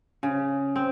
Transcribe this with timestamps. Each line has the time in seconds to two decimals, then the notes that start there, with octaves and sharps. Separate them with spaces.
0.23 C#3
0.76 C4